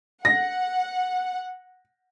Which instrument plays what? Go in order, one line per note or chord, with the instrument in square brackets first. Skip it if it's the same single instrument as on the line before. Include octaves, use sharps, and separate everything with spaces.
[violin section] F#5 [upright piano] A#6